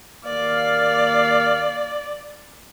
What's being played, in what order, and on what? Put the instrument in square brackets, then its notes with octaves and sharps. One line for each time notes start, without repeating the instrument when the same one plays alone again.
[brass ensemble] D#2 A#3 F5 [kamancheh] D5